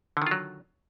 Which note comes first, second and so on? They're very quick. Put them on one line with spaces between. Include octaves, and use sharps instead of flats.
D3 D#3 F4 F#3